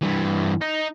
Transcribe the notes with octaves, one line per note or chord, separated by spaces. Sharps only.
G2 E3
D#4